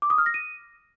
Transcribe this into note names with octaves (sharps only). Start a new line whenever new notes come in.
D6
D#6
F6
A#6
D#7